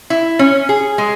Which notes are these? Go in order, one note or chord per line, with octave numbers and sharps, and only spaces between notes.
E4
C#4
G#4
G#3